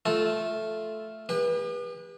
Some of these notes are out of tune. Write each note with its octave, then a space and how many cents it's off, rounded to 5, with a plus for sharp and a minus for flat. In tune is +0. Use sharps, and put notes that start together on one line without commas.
A3 -5 F4 +0 A4 -10
G4 +45 B4 -25